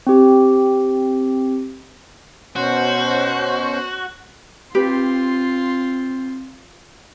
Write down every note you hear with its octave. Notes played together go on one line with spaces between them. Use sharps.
C4 G4
B2 C#4 F#4 C5
C4 F4 G4 B4 C6